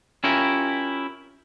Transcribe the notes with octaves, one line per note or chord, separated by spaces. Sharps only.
C#4 E4 F4 G4 A#4